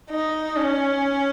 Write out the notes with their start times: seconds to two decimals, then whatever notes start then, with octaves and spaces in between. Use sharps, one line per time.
0.10 D#4
0.56 C#4